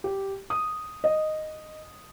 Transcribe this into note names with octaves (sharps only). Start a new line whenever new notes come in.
G4
D#6
D#5